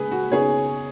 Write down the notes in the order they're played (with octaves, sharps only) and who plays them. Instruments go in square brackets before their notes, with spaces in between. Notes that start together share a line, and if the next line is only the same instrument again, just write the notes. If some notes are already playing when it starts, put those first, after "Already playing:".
Already playing: [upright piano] C#3 G#3 G#4 B4
F#4
C#3 B3 D#4 G#4 C#5